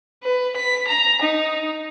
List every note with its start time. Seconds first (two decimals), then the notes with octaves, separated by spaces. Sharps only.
0.23 B4
0.57 B6
0.88 A#5
1.22 D#4